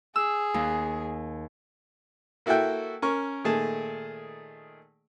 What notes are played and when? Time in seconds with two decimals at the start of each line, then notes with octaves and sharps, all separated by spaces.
0.16 G#4 E6
0.54 D#2
2.46 A#3 E4 F#4 A4 E5 G5
3.02 C#4 A#4 C#6
3.44 A#2 D#3 A3 G#4 A5